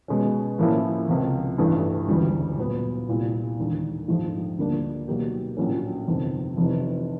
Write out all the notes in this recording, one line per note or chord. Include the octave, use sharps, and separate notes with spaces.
B2 G#3 C#4
A2 F3 A#3 C#4 E4
C#2 C3 F3
A1 G2 E3 A3 D4
E1 D2 C#3 E3 G3
A#2 F#3 B3
C2 A#2 G3
E1 D#2 D3
A#1 G#2 F3 A3
D2 D3 G3 A#3 D4
B2 F#3 A#3 D#4 G4
A#1 A2 F#3 A#3 C#4
G1 F2 C3 D#3
F1 F2 C3 E3